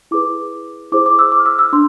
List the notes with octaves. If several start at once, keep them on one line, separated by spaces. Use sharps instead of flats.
E4 G#4 B4 D6
E4 G#4 C5 D6
D6
E6
D6
F6
E6
E6
D4 C6